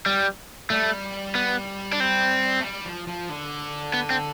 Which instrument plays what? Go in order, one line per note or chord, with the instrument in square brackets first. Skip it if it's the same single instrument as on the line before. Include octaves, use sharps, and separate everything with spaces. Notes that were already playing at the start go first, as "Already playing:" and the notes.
[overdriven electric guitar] G3
[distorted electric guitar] G3 [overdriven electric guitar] A3
[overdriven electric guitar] B3
D4
C4
[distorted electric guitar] A3
G3
F3
F3
D3
[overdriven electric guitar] B3
C4